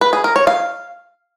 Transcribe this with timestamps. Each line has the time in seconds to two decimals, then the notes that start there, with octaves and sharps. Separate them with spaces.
0.01 B4
0.13 G#4
0.24 A#4
0.36 C#5
0.47 F5